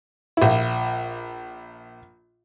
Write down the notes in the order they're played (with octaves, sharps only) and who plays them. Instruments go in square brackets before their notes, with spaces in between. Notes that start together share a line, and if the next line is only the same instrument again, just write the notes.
[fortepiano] A#1 E4